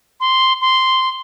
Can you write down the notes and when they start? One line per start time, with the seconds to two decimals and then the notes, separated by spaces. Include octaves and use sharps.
0.20 C6
0.61 C6